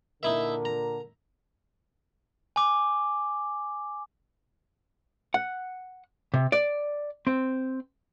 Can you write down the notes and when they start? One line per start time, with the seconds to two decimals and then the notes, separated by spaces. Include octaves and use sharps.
0.23 A#2 D3 D#4 E4 A#4 E5
0.65 A#5
2.56 G#5 D6
5.34 F#5
6.34 C3
6.52 D5
7.27 C4